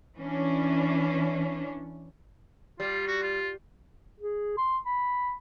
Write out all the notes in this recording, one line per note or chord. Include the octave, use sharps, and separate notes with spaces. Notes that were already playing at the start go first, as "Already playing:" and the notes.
E3 C#4 D4
G3 F4
F#4
F4
G#4
C6
B5